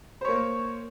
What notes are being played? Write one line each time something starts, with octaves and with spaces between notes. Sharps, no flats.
A#3 C5 C#5